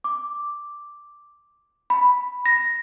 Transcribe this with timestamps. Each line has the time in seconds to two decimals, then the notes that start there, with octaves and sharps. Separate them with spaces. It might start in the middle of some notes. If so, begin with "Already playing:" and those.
0.04 D6
1.90 B5
2.46 A#6